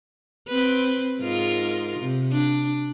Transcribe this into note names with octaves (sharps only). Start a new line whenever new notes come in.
C4 B4
G#2 F4 A#4
C3
D4